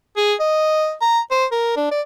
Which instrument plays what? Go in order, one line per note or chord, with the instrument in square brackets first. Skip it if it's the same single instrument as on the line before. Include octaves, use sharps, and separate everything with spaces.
[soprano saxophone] G#4
D#5
A#5
C5
A#4
D4
D5